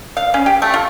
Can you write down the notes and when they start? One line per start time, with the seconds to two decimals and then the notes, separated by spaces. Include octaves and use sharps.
0.17 F5
0.34 C#4
0.46 G4
0.62 A3
0.74 F4